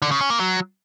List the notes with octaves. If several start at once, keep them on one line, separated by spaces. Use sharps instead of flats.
D3
C#3
C#4
A#3
F#3